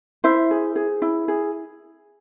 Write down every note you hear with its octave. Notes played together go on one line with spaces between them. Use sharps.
E4 C5 E5
G#4
G#4
E4
G#4